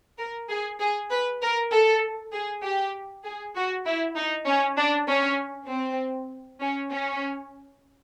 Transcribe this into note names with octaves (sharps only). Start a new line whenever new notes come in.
A#4
G#4
G#4
B4
A#4
A4
G#4
G4
G#4
F#4
E4
D#4
C#4
D4
C#4
C4
C#4
C#4